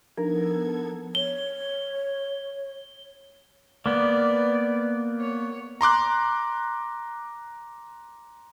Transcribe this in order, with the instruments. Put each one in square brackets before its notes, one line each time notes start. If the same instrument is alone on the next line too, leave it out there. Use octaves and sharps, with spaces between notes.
[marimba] F3 D4 D#4 [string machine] B3 A4 G#6 [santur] A#4
[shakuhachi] C#5 [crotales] G7
[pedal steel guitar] A#3 B3 [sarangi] D5
[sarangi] C#5
[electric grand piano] A#5 C6 D6 F#6